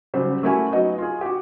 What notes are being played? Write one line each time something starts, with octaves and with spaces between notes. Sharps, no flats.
C#3 F#3 G3 C5
A3 A#3 C#4 E4 F#4 G#5
F#3 B3 D#4 F#4 D#5
F4 G#4
F#4 G4